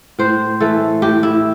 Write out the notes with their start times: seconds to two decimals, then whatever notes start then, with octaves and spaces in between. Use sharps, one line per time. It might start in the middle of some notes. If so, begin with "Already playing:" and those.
0.19 A2 C5
0.60 E3 A3 A4
1.02 A2 G4
1.23 E4